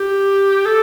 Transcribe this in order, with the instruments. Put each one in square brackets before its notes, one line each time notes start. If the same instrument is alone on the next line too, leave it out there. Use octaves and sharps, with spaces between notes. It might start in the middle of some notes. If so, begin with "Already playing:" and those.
Already playing: [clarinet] G4
A4